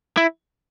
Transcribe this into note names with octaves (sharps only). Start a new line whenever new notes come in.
E4